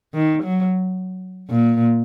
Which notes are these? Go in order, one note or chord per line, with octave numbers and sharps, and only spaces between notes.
D#3
F#3
A#2